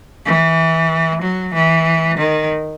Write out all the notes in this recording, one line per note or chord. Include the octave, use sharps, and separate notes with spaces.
E3
F#3
E3
D#3